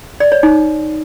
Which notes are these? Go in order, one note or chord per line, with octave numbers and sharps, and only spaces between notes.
D5
C#5
D#4